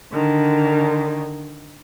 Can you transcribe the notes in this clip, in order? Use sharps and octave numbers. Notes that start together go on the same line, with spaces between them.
D3 D#3